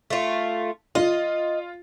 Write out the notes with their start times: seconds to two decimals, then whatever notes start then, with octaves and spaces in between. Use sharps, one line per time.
0.10 A3 F4
0.95 F4 D#5